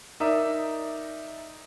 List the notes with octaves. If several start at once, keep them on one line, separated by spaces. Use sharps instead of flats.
D#4 A#4 D5 E5 A#5 D#6